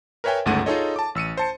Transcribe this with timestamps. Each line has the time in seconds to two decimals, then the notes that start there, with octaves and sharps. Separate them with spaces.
0.24 A#4 B4 C#5 E5 G5 G#5
0.46 G1 C#2 G#2 A3 F#5 D#7
0.66 D#4 F4 G#4 A4 C#5 D#5
0.96 A5 D6
1.15 A1 E6 C#7 D#7
1.37 C5 A5 C#7